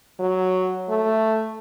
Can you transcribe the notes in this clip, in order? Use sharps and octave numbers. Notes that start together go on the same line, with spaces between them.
F#3
A3